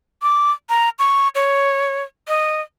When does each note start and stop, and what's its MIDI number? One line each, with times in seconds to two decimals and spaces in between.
0.22 0.52 86
0.69 0.89 82
0.99 1.28 85
1.35 2.03 73
2.28 2.61 75